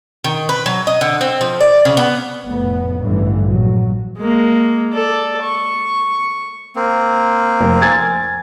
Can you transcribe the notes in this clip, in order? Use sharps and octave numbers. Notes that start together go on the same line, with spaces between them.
D#3
B4
F#3
D#5
D3
C4
F3
D5
C#3
B3
F1 A2 B3
A1 G2 D3 E3
A#1 F#3
G#3 A#3
A4 D5
C#6
A#3 C4
F1 A#4
G#5 G#6 A6